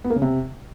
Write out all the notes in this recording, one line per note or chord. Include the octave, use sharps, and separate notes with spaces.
B3
A#3
C#3
C3